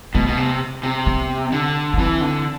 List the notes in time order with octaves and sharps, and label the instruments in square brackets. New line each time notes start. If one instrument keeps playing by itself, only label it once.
[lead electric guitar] B2 [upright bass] A3
[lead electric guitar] B2
C3
C3
[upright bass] B3
[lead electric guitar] D3
[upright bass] B3
[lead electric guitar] E3 [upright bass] C4
[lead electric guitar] D3